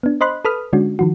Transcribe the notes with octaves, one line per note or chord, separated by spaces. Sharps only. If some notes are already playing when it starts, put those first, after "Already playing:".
B3 D4
C5 D#5 B5 C6 F#6
A4 B4 B5 D#6 F6
D3 G#3 C#4 D4 F#4
D#3 F3 F#4